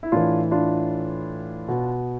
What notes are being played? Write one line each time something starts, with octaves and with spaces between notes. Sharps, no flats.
E4
A2 E3 D4 F4
D4 F4
B2